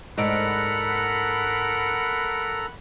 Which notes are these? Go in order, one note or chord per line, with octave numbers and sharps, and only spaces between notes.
G#2 A4 A#4 D5 F#5 A#5 B5